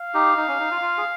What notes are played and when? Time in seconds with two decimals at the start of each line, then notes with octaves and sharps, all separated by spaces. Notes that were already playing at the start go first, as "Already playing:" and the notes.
Already playing: F5
0.14 D#4 G4
0.37 D#4
0.48 C#4
0.59 D#4
0.71 F4
0.82 F4
0.97 G#4